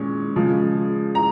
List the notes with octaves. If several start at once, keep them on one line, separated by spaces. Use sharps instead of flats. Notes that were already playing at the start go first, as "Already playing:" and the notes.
Already playing: A#2 G#3 C#4
C#3 F3 G#3
A#5